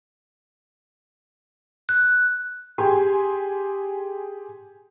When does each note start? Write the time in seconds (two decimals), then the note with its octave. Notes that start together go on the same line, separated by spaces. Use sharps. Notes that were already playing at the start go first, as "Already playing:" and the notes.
1.89 F#6
2.78 G4 G#4 G#5 C6